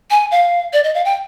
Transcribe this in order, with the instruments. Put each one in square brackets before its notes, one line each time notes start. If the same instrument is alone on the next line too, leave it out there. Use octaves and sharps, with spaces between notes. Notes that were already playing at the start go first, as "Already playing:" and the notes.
[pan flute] G#5
F5
D5
D#5
F5
G5